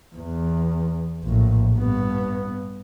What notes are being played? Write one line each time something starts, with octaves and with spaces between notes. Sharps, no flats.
E2
A#1 A2
G2 B3